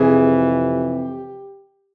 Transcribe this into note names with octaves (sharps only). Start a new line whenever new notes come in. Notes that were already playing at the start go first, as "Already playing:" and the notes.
Already playing: F2 C3 E3 G#4
G4